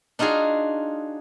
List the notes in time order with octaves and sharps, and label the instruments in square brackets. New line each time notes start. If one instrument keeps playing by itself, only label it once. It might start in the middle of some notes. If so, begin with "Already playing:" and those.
[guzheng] D4 D#4 F4 F#4 G#4